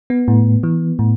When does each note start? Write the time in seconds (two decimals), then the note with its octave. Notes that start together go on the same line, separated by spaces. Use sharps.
0.10 B3
0.28 A2
0.63 E3
0.99 A2